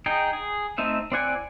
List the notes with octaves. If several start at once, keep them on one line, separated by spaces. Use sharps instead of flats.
D#4 G#4 G5
G#4
A3 C4 D#4 E5
C4 E4 D5 F#5 G#5